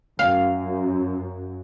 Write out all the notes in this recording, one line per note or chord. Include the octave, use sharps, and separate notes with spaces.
F#2 F5